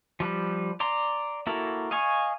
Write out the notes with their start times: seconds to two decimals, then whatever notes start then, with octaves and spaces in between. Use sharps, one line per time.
0.20 F3 G3 B4
0.80 D5 A#5 C6
1.47 A#3 E4 F#4 A4 A#4
1.91 D#5 F5 G#5 C#6